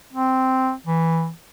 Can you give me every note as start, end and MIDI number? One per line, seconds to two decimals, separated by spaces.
0.13 0.73 60
0.86 1.30 52